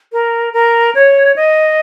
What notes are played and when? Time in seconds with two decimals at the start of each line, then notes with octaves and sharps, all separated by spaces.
0.12 A#4
0.53 A#4
0.95 C#5
1.36 D#5